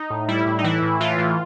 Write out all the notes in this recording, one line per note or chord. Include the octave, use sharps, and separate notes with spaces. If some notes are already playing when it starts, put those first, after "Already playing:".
Already playing: D#4
A2
G3 E4
A2
D#4
E3 E4
A2
E3 F4
A2